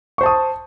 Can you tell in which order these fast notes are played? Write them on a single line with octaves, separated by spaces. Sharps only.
C#6 C5 A5 D#6